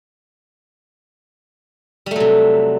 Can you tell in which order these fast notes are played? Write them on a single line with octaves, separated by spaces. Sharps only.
G3 A3 F#3 C3